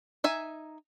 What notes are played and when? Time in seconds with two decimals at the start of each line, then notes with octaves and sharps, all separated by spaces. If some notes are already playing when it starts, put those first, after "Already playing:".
0.24 D#4 E5 G#5